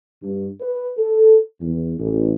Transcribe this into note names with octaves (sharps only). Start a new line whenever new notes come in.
G2
B4
A4
E2
A1